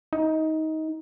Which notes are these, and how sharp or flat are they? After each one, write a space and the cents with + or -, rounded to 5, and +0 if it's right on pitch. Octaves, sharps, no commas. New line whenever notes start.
D#4 +20